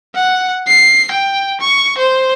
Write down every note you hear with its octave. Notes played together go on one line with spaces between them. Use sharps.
F#5
C7
G5
C#6
C5